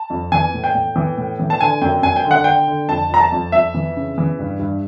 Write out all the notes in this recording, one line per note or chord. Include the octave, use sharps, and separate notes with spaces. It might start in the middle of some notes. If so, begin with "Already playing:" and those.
Already playing: A5
F2
E3 G#5
A2
G5
A2
E3
A2
E3
A5
D3 G#5
F#2 G5
F#2 G#5
G5
D3
F#5
D3 G5
D3
F2 A5
F2 A#5
A5
F2
F2 E5
E3
C#3
E3
G2
G2